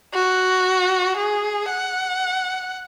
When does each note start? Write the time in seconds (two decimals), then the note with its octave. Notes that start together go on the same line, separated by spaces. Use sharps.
0.14 F#4
1.17 G#4
1.69 F#5